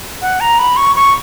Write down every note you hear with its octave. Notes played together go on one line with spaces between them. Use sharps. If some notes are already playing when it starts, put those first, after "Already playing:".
F#5
A#5
B5
C#6
C#6